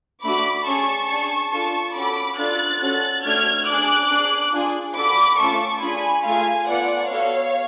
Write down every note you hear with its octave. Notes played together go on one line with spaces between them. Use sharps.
A3 D4 F#4 B5 D6
C#4 G#4 A5 C#6
D4 G#4
D4 F4 A4 A5 C#6
C#4 F#4 A4 B5 D6
D4 F4 A4 F#6 A6
C#4 F#4 A4
A3 D4 F#4 F6 G#6
D4 G#4 D6 F#6
D4 G#4
D4 F4 G#4
D4 F#4 A4 B5 D6
A3 C#4 F4 A5 C#6
D4 F4 G#4 G#5 B5
A3 F4 G#4 F5 G#5
B3 F4 A4 D5 F#5
B3 F#4 A4 C#5 F5